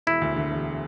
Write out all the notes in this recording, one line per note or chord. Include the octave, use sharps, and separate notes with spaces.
E1 E4
D2
D3
E1